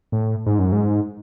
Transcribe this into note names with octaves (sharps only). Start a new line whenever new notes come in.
A2
G#2
F#2
G#2